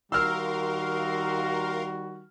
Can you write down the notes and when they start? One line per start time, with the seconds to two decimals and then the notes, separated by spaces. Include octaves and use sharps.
0.12 D#3 G3 F#4 A#4 F5 C6 E6 F6